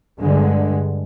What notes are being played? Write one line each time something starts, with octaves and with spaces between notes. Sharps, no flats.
G2 D3 G#3